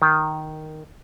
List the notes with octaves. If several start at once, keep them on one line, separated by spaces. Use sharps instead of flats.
D#3